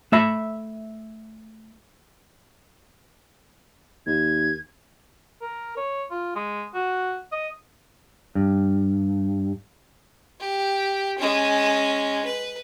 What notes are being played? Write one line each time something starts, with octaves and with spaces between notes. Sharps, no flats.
A3 E5 B5
D#2 G#6
A#4
C#5
F4
G#3
F#4
D#5
G2
G4
G#3 C#4
B4